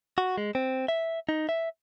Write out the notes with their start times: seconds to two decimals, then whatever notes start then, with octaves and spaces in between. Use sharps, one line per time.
0.18 F#4
0.38 G#3
0.55 C4
0.88 E5
1.29 D#4
1.49 E5